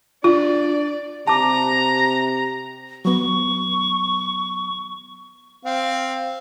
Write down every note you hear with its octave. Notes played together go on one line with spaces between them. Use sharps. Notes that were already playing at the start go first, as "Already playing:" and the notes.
D4 F4 D5
C3 A5 A#5 D6
F#3 B3 C#6
C4 F5